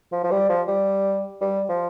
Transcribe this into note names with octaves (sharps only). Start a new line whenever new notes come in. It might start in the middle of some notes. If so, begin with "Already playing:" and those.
F3
F3
G3
F3
G3
G3
F3